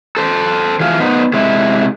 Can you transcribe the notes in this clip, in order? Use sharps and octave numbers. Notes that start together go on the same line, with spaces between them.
A4 C5
E3 F3 G#4 F5
B3 D#4 C5
C3 G#3 E4